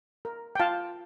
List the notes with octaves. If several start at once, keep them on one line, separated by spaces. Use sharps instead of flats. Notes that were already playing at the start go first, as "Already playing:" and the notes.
A#4
G5
F4 F5 A5